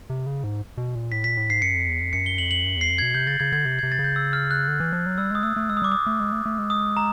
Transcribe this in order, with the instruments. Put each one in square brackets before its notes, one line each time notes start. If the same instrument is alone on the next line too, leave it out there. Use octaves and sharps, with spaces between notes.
[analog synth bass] C3
C#3
G#2
B2
A#2
[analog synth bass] A2 [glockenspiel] B6
[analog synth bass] A#2 [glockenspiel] B6
[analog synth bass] A2
[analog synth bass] G#2 [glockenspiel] C7
[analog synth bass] F#2 [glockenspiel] C#7
[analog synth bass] F2
E2
F2
[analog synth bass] F#2 [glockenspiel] C#7
[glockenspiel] G7
[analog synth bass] F2 [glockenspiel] F#7
[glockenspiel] F#7
[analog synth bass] F#2
[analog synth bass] E2 [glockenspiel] C7
[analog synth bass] F2
[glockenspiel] G#6
[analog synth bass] B2
[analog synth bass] C3 [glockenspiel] G6
[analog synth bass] C#3 [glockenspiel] A6
[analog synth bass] C#3 [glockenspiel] G#6
[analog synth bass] D3 [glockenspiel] G#6
[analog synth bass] C3 [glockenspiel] G#6
[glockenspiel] G#6
[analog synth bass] C3
[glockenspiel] A6
[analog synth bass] C#3
[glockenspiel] G6
E6
F6
F#6
[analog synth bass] D3
E3
F3
F#3
[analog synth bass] G3 [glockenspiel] E6
[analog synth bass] G#3 [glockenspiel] D#6
[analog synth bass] A3 [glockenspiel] E6
[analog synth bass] A3
[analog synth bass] G#3 [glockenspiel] E6
[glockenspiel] D#6
[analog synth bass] G3 [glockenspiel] D6
[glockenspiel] D#6
[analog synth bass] A3
G#3
A3
A3
G#3
[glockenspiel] D#6
A#5